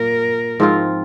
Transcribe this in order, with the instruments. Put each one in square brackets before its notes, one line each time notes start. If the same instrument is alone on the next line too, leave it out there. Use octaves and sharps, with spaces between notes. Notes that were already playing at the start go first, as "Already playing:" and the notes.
Already playing: [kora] A#2 A#3 [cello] A#4
[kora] G#2 F3 C4 F4